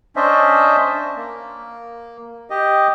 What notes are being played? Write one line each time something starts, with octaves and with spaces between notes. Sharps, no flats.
C#4 D4 C5 D#5 E5
A#3
G4 D#5